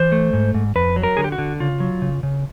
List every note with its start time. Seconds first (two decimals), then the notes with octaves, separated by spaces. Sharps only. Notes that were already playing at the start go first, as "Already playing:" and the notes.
Already playing: E3 C5
0.12 A3
0.33 G#2
0.55 G#2
0.76 F2 B4
0.96 F#3
1.03 A#4
1.17 D3 G#4
1.24 G4
1.32 F#4
1.38 D3
1.60 C#3 F4
1.80 F#3
2.02 C#3
2.23 C#3